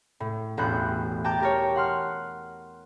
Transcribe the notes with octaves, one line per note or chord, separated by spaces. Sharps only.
A2
E1 A1 A2 B3 F#6 G6
G5 A5 A#5 D6 G6
G4 A#4 C#5
F#5 C6 F6